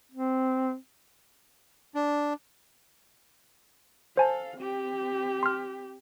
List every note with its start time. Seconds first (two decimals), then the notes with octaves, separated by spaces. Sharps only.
0.12 C4
1.95 D4
4.17 A4 C5 F5 G#5 A5
4.57 C4 G4
5.43 C6 F6